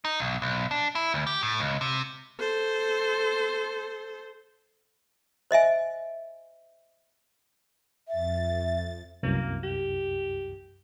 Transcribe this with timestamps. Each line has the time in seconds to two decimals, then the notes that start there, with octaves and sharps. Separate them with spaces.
0.05 D#4
0.20 B1
0.42 B1
0.71 D4
0.95 E4
1.14 D2
1.27 G4
1.43 A2
1.60 C#2
1.81 C3
2.39 A4 C5
5.51 C5 D#5 E5 G#5
8.08 F2 E5 A6
9.23 C2 F#2 A#3
9.63 G4